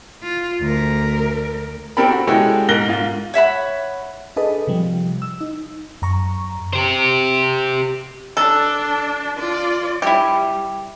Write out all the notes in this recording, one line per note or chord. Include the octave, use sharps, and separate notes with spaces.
F4
D2 A#4
C4 D4 G4 A4 A#4 B5
F#4 F#5
G#3 C#4 E4 F#4 G4 A4
G#2 A#4 F#6 A#6 G7
G#2 F4
C#5 E5 F#5 B5
D4 G#4 A4 B4 D#5
C3 F3 G3
E6
D#4
F#2 A#5 C#6
G4 C5
D4 A4 D5
F4 D5
G3 E4 G4